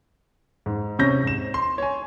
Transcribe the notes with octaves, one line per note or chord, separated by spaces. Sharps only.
G#2
C3 C#4 G6 A#6
G#2 E7
C6
C#5 G#5